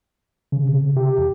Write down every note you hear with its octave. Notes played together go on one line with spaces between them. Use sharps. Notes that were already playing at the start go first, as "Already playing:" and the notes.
C#3
C3
G4
E2